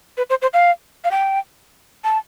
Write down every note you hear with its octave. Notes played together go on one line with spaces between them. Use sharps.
B4
C5
C5
F5
F5
G5
A5